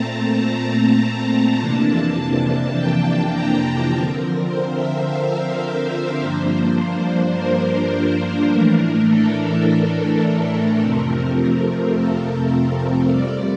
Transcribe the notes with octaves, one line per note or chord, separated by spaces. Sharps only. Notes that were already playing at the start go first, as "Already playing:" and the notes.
Already playing: A#2 A3 C4 A5 A#5
A#5
A5
F2 C3 E3 A#3 D4
G5
A5
A#5
A5
D3 F3 C4 A#4
C5
E5
F5
E5
C5
G2 F3 A#3 D4
A#4
A2 E3 A3 D4
A4
A#4
A#4
A4
A#4
F2 C3 F3 A3 C4
A4
A#4
F2 C3 G3 D5